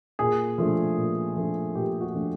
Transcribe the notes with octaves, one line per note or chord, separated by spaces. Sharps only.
A#2 G#4
F3 A3 D4
A#2
F3 A3 D4
A#2 G4
F#4
F3 A3 D4